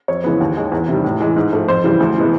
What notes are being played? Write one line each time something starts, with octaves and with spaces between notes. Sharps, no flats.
F2 C#5
C#3 E3 G#3 B3
D#2
D#3 G#3
E2
C3 D#3 G3
A2
E3 G#3
G#2
F3 A3
F2 C5
C#3 E3 G3
D2
C3 E3 G#3 B3